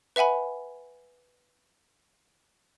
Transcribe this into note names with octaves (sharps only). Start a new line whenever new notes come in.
B4 E5 F#5 G#5 B5